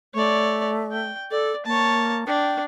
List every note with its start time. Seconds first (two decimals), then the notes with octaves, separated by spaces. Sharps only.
0.14 A3 C#5 D5
0.92 G5
1.31 A4 D5
1.66 A#3 C#5 A5
2.27 D4 G5